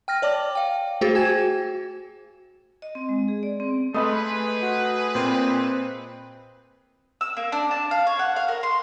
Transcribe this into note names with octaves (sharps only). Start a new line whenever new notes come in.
G5 F6 A#6
C#5 D5 A5 D6
F5 G5
A3 F#4 G#4 C5 A6
F#4 G5 G#5 G#6 E7
F#4
D#5
C4
G#3
G#4
D5
C4
A3 G#4 B4 D#5 B5 C6
F#4
A#2 C4
E6
A#3
D4
A5
F5
C#5
F#5
F5
A#4
C6